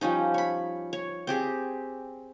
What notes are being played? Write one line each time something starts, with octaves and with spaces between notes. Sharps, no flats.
F3 G3 C#4 D#4
C#5 B5
C#5
C4 G4 G#4